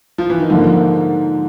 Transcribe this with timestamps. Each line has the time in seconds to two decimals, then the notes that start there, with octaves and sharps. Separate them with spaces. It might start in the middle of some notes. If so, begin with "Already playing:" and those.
0.18 F3
0.30 E3
0.40 D#3
0.50 G#2 D3 F3 A#3